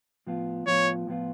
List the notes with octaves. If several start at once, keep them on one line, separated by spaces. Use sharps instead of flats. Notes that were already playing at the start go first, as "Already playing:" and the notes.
A2 F3 B3 F4
A2 F3 B3 F4 C#5
A2 F3 B3 F4